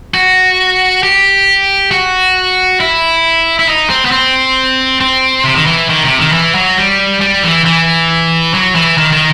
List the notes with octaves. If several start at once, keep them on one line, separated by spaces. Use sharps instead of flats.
F#4
G4
F#4
E4
E4
D#4
C4
B3
C4
C4
C3
D#3
E3
D#3
C3
D#3
E3
F#3
G3
G3
E3
E3
F#3
E3
D#3
D#3